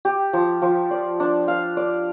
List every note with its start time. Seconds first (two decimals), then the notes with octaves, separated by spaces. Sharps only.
0.05 G4
0.33 F3
0.62 F3
0.91 D5
1.20 D4
1.48 F5
1.77 D5